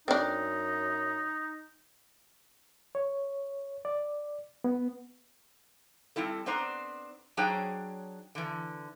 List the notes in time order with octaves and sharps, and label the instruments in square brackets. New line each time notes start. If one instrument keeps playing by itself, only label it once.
[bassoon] F#2 [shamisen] C4 D4 [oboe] D#4
[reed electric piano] C#5
D5
B3
[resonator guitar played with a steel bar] G3 C4 E4 A4
B3 C4 D4 C5 A#5
F#3 D4 G#4 C5 C#5 G5
D3 E3